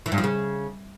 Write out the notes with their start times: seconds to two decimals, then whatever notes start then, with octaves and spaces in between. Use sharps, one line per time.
0.06 E3
0.12 G2
0.18 F3
0.24 C#3